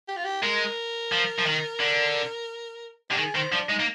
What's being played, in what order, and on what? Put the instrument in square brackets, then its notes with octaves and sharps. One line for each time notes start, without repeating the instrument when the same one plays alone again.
[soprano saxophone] G4
F4
G4
[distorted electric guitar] G#3 [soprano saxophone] A#4
[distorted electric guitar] F3
F3
D#3
D3
[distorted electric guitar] D3 [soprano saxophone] G4
[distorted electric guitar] D#3 [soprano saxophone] G#4
[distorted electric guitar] D#3 [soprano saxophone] C5
[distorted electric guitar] F3 [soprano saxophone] D4
[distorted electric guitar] G#3 [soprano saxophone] D#4
[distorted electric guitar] A#3